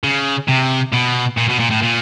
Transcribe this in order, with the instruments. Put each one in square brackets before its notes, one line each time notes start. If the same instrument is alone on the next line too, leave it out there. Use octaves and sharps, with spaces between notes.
[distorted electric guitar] C#3
C3
B2
A#2
B2
A#2
A2
A#2